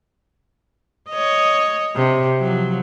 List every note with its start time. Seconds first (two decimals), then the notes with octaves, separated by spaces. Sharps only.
1.10 C#5 D#5
1.95 C3
2.40 F3 F#3